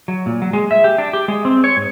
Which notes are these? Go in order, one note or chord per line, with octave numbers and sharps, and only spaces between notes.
F#3
A#2
F#3
G#3
E5
G4
D4
G4
G#3
C4
C#5
G#2